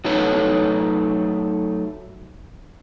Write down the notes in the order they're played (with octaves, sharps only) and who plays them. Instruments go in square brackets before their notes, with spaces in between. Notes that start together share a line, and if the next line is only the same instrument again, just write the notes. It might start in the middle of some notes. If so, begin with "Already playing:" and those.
[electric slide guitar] F#3 A3 D#4 A4 B4 C#5